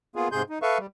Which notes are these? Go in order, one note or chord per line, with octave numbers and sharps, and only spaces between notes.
A#3 B3 F4 G#4
G#2 C3 G#4 C6 G6
D#4
A4 B4 E5 F5 C#6
G3